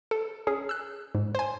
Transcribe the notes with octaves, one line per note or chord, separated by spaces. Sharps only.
A4
C#4 G#4
E6 F#6
G#2
C5 G#5